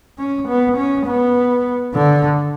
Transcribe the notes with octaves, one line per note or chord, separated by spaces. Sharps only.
C#4
B3
C#4
B3
D3